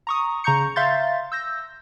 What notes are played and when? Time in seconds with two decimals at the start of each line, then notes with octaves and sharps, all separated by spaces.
0.07 A#5 C#6 D#6
0.44 C#3 A#5 C#6 G6 C#7
0.76 E5 F5 C6 G6 A6
1.32 E6 G6 A#6